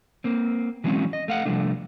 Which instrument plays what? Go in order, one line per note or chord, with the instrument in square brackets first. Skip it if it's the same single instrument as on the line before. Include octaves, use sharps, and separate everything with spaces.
[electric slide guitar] A#3 C4
E3 F#3 G#3 A#3 C4 C#4
D#5
A3 F5 F#5
C3 F3 G3 A3 D4